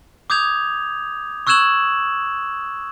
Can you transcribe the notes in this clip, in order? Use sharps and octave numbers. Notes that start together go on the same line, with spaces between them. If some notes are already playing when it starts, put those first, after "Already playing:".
D6 D#6 G6 G#6 F7
C#6 E6 F#6 G#6 E7 F#7